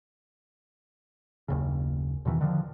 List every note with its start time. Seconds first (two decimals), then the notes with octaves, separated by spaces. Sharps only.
1.48 F#1 D#2 C#3
2.25 E2 B2 D#3 E3
2.41 D3 D#3 F3